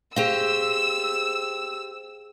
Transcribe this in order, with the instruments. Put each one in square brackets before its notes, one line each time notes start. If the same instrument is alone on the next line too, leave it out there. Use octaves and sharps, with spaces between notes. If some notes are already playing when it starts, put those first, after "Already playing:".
[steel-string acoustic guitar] G4 C5 [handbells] G#4 F5 [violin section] E6